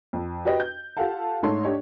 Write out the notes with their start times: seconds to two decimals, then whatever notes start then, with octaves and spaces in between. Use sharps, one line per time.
0.13 F2
0.45 F#4 G4 B4 D#5 G5
0.60 G6
0.97 F4 G4 A4 F5 F#5 A5
1.43 G#2 A3 D#4 A4 C#5 C6
1.64 D4 G4 C#5 D#5